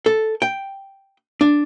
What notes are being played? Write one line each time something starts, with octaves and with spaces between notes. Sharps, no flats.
A4
G5
D4